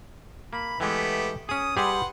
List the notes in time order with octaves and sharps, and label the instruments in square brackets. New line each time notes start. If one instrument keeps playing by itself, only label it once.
[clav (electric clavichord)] A#3 [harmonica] B5
[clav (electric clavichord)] E3 G#3 [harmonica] A3 B3 G4
[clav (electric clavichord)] C#4 G#4 [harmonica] D#6
[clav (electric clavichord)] G3 G4 G#4 [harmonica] B4 F#5 C6